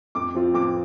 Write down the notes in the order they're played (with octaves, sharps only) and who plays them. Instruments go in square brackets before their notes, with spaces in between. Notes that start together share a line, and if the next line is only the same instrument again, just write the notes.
[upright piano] F2 D6
F3 C4 F4
F2 D6